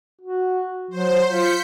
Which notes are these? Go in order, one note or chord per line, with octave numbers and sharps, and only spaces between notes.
F#4
F#3 C5
F4 G6 B6 C#7